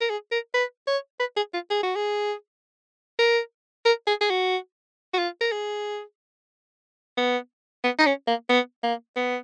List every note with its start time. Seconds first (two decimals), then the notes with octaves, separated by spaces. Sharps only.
0.01 A#4
0.10 G#4
0.32 A#4
0.54 B4
0.87 C#5
1.20 B4
1.36 G#4
1.54 F4
1.70 G#4
1.83 F#4
1.96 G#4
3.19 A#4
3.86 A#4
4.07 G#4
4.21 G#4
4.30 F#4
5.14 F#4
5.18 F4
5.41 A#4
5.52 G#4
7.17 B3
7.84 B3
7.99 D#4
8.06 C#4
8.28 A#3
8.49 B3
8.83 A#3
9.16 B3